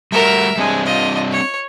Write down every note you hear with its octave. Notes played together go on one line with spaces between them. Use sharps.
G3 A3 F#4 A#4 E5
G3 G#3 C4 D4
F4 D#5
C#5